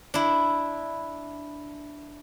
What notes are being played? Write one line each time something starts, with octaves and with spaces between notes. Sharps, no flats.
D4 E4